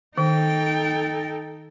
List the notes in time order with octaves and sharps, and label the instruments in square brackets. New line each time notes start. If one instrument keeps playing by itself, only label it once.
[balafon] D#3 [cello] D#4 A4 [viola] G5